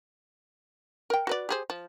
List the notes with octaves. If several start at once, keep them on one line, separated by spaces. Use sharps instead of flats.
A#4 G5
F#4 B4 D5
G4 G#4 C5
F3